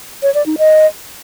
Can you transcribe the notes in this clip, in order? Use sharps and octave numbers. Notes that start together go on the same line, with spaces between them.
C#5
D5
D#4
D#5